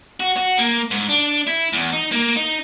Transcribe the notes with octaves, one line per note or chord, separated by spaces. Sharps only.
F#4
F#4
A#3
G#2
D4
E4
E2
D#4
A#3
D#4